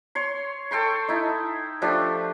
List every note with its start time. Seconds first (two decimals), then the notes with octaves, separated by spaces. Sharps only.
0.15 C#5 C6
0.71 A4 G5 C6 C#6
1.08 D#4 E4
1.82 F3 A3 D4 G4